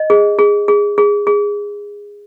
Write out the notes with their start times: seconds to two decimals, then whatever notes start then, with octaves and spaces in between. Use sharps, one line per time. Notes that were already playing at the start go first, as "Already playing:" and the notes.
Already playing: D#5
0.10 G#4
0.39 G#4
0.68 G#4
0.98 G#4
1.27 G#4